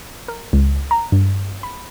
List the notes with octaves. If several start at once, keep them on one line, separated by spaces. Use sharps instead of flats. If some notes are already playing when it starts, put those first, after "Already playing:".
A#4
C#2
A#5
G2
B5